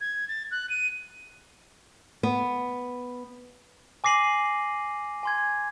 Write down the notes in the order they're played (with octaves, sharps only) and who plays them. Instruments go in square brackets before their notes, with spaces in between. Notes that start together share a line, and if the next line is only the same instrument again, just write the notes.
[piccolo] G#6
A6
F#6
D#7
[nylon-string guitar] B3
[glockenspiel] G#5 D6 A#6 C7 D#7 F#7
G#5 C6 G#6